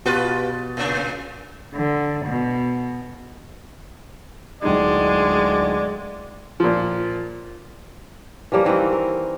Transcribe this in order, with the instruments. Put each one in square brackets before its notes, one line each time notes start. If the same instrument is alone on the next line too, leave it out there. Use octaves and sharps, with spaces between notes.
[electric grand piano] B2 A6 [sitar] F4 G4 B4
[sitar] A2 C#3 D4
[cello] D3
B2
[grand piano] D1 D#4 [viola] G#3 [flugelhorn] D5
[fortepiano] A#2 F3
[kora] E3 F3 G3 A#3
D#3 E3 A#3 C4
A#4